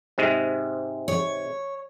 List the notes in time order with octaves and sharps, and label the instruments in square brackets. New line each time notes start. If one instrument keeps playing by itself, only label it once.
[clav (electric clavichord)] G#2 C3 G#3
[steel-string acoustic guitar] C#5